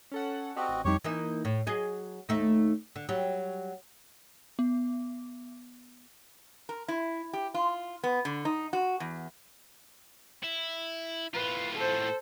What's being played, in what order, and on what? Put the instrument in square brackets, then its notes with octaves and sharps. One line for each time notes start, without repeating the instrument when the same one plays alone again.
[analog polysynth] C#4 A4 F#5
[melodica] C4 F#4 D#5 [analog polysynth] G4 A4 D5
[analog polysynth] A1
[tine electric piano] F2 G3 D#4 [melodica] G4 C#5 C#6
[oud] E3 A#3 D#4
A2
F#3 G#4 D#5
D#2 A3 D#4
D3
F#3 G3
[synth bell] B3
[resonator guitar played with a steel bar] A#4
E4
G4
F4
B3
D3
D#4
F#4
E2
[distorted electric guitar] E4
[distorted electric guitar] A2 F4 [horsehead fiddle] B4
[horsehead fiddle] A4 C5